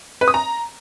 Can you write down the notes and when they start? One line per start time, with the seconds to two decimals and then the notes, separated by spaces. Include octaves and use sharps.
0.21 B4
0.28 D#6
0.34 A#5